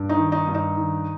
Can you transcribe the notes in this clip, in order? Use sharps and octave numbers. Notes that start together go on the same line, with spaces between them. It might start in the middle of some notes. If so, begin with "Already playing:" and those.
Already playing: G2
D#4
D#3
D#4
G2
D#4
D#3